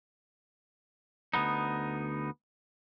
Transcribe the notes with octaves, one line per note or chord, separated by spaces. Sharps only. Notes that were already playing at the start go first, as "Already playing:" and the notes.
D2 G#2 B3 D#4